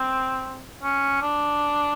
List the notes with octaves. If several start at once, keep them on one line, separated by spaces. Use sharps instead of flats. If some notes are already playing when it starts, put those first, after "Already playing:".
Already playing: C4
C#4
D4